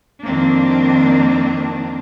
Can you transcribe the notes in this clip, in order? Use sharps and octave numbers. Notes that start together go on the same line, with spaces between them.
F2 D#3 A#3 C4 D4